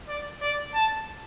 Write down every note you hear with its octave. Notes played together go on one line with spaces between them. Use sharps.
D5
D5
A5